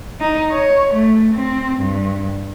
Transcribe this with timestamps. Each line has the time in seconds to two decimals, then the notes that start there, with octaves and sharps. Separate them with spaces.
0.20 D#4
0.51 C#5
0.93 A3
1.35 C4
1.80 G2